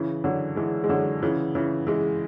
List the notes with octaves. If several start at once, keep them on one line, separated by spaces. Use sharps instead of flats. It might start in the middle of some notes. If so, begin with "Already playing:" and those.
Already playing: C#3 E3
D3 F#3
E3 G#3
G#3
D3 F#3
C#3 E3
C#3 E3
E3 G#3